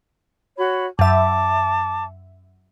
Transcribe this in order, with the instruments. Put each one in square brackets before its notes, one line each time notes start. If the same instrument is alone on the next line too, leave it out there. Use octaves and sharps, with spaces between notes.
[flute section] F#4 C#5 B5
[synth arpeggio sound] F#2 E5 [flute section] A5 D6